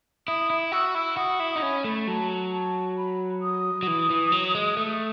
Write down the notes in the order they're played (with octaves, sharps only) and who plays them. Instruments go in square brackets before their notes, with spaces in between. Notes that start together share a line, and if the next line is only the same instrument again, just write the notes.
[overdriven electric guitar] E4 [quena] D#6
[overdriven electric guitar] E4
[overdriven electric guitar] F#4 [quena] E6
[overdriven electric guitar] E4
[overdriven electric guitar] F#4 [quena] D#6
[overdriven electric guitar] E4
D#4
[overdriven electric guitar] C#4 [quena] B5
[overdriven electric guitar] A3
[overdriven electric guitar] F#3 [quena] A5
[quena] A5
B5
D#6
[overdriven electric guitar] F#3
E3
E3
F#3
G#3
A3